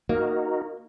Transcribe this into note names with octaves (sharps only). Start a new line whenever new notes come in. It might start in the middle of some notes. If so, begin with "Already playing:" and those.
A#3 D#4 F#4 A#4